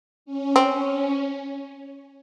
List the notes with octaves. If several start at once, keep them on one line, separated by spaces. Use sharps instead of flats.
C#4
C4 C#4
C#4